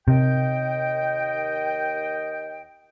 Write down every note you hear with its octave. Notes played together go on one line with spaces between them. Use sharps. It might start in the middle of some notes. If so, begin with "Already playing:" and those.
D#2 C3 D#5 G5